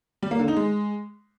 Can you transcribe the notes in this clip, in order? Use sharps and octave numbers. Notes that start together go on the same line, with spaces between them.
G3
A#3
D3
D#4
G#3